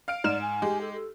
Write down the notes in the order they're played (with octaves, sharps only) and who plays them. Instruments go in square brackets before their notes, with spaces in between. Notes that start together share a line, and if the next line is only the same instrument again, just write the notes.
[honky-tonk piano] F5 F6 D7
[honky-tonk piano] G#2 [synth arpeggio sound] D#4 F6 E7 [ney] D5
[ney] G#5
[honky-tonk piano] G#3 G4
[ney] A4
A4